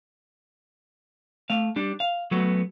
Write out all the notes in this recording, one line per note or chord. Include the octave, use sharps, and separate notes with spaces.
A3 F5
G3 D4
F5
F#3 A3 B3 F#4